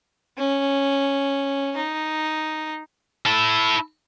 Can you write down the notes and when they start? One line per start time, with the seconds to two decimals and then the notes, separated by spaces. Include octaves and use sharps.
0.38 C#4
1.76 D#4
3.26 E4 A4